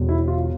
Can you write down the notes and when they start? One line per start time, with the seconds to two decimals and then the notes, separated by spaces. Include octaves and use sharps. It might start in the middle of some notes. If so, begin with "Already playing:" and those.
Already playing: E1 E2 D3
0.09 E4
0.28 F4